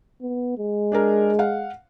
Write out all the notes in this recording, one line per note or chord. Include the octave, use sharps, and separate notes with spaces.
B3
G#3
D4 G#4 A#4
F5 F#5